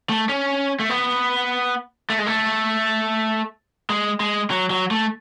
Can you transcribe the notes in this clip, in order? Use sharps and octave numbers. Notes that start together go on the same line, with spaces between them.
A3
C#4
A3
B3
A3
G#3
A3
G#3
G#3
F#3
F#3
A3